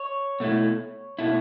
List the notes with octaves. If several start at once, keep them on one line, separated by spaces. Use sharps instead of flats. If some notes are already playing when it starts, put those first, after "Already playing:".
Already playing: C#5
B2 A3 E4
B2 A3 E4